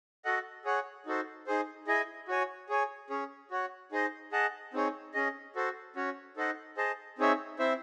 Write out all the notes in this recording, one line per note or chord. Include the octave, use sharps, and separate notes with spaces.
F#4 A4 D#5 F#5
G#4 C#5 F#5
D#4 F#4 A4 C5
D#4 G#4 C5
E4 G#4 D#5 G#5
F#4 C#5 G#5
G#4 C#5 G#5
C#4 G#4 C#5
F#4 C#5 F#5
D#4 G#4 C5 D#5
G#4 D#5 F#5 A5
C4 D#4 G#4 C#5
C#4 G#4 D#5
F#4 A4 C5
C#4 F#4 C#5
D#4 A4 C5 D#5 F#5
G#4 C5 D#5 A5
C4 D#4 G#4 C#5 E5
C4 E4 C5 E5